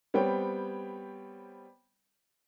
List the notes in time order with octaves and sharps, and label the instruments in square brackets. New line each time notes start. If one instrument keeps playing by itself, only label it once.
[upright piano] G3 B3 C4 C#5 G5